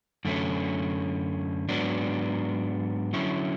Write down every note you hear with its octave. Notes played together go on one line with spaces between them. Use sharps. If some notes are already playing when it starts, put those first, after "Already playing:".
F#2 D3 A3 C#4
G#2 F#3 B3 D4
D3 F#3 C#4 E4